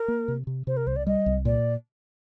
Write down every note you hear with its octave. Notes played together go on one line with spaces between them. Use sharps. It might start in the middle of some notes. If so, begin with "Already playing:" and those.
Already playing: A#4
A#3
C3
C3
C3 C5
A#4
C2 C5
D5
G3 D#5
C2
A#2 D5